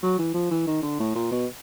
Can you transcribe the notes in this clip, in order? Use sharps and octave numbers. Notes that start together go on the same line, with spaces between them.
F#3
E3
F3
E3
D#3
D3
A2
A#2
B2